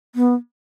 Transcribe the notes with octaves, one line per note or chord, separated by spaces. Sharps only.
B3